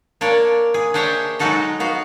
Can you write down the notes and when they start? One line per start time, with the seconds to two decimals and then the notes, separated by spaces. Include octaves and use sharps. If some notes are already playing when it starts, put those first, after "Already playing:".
0.21 A#3 D4 C#5 D5
0.74 G#4
0.94 D4 G#4 C5 C#5 E5 G5
1.39 F#3 G#3 D#4 F#4 A4 D#5
1.80 B3 F#4 F5